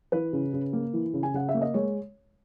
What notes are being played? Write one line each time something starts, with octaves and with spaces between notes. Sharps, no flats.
E3 B4
C#3
C#3
A#3
E3
C#3
G#5
C#3 F#5
E5
A#3
D#5
G#3 C#5